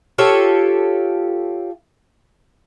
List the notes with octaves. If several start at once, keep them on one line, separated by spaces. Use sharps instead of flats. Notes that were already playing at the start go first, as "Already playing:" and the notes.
F4 G4 A4 C#5